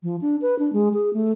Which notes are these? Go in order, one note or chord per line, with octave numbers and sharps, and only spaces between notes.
F3
D4
B4
D4
G#3
G#4
A3